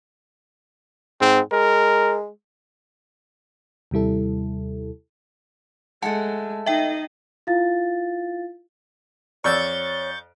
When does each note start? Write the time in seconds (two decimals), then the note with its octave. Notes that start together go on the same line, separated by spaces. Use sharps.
1.21 G#2 C4
1.52 G#3 A#4
3.91 D#2 C3 G3 E4 A4
6.02 G#3 A3 F#5 A5
6.66 D#4 D#5 E5 G5
7.47 E4 F4 F5 A6
9.44 F2 C#5 D5 C#6 E6 G6 A6